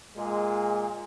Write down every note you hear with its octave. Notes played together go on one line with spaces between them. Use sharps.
A#2 G#3